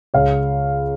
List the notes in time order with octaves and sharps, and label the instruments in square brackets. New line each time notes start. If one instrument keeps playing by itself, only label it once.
[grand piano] C#2 C#5 F5